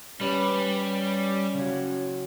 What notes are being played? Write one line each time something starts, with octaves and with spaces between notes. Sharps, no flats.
G3 C#4 B4
C#3 F#3